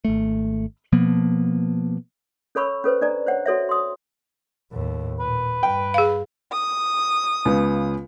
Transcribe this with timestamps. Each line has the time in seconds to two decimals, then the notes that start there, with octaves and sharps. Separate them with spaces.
0.05 G#1 A3
0.92 B2 F3 A#3 B3
2.55 C#4 A4 C#5 B5 C#6 E6
2.84 C#4 A4 B4 C5
3.01 D4 A4 D5 A#5
3.26 C5 C#5 F#5
3.46 F#4 A4 C#5 E5
3.69 C6 D#6
4.72 D#2 A2
5.20 A#2 B4
5.63 G2 G5
5.94 G#4 F5
6.52 D#6
7.45 C#2 C#3 B3